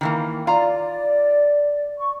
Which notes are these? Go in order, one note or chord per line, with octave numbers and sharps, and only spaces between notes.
D#3 E3 A#3
F4 D5 F5 A#5
C#6